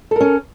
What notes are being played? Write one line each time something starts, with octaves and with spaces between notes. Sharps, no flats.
C#4 A4 A#4